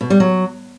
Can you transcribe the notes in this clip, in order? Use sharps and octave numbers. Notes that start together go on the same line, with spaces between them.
B2
G3
F#3